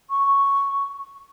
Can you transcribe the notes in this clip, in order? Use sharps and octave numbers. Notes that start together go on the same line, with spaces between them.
C#6